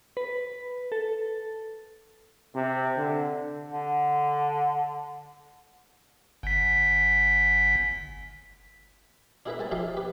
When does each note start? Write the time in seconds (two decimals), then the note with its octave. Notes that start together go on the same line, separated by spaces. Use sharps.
0.17 B4
0.92 A4
2.53 C3
2.96 D3
3.72 D3
6.43 G1 B6
9.46 D4 E4 G#4 A#4 B4 E5
9.59 C2 G#5 A5
9.71 F3 D#4 G4 G#4 E5 F5
9.97 G4 B4